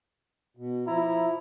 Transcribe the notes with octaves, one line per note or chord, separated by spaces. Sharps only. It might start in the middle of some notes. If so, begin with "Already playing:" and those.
B2
F3 E4 A#5